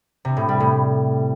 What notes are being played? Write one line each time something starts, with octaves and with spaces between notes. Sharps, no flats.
C3
A2
G3
A2